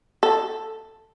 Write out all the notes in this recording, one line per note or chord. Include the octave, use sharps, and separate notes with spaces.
A4